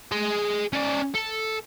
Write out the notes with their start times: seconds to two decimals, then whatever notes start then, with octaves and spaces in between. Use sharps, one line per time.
0.11 G#4 C6
0.73 C#4 D5
1.15 A4